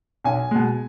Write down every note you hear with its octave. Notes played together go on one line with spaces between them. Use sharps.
B1 G#5
B2 G#3